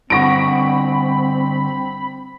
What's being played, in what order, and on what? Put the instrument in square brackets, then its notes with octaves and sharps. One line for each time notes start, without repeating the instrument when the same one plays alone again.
[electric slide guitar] G2 D3 F#4 [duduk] C4 [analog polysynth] B5 [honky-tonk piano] C#6 A#6 D7